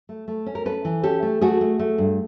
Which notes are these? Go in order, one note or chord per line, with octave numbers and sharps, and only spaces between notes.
A3
A3
C#4
A#4
C#4 A4 B4
E3
C#4 G4 A4
A3
A3 F#4 G#4
A3
A3
G2